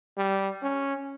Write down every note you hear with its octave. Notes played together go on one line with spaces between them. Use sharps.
G3
C#4